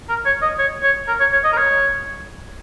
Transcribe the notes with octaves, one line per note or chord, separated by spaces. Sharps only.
A#4
C#5
D#5
C#5
C#5
A#4
C#5
C#5
D#5
A#4
C#5